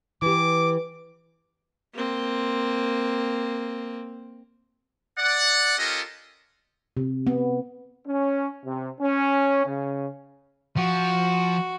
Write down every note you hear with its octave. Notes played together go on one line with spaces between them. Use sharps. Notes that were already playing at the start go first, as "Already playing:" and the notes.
E3 G4 D6
A#3 C4
D5 F#5
C#4 F4 G4 A4 A#4 D#5
C3
B3
C#4
C3
C#4
C#3
F3 F#4